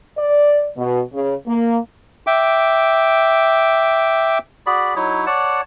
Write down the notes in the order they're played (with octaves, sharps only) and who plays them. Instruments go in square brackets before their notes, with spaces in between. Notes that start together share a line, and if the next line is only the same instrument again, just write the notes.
[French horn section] D5
B2
C#3
A#3
[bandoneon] E5 G5 D6
[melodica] F#4 G#4 D5 B5
F#3 D#4 E4 C#5
C#5 D5 F#5 A5